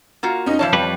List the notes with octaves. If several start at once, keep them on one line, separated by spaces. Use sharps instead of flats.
A#3 F4 F#4
C#4 D#4
E3 F3 C#5 F5 A5
F2 G3 B4